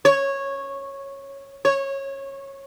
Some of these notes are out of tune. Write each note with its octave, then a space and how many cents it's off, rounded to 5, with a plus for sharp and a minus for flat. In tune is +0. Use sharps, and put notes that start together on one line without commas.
C#5 -10
C#5 -20